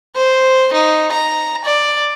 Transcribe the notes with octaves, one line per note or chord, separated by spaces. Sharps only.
C5
D#4
A#5
D5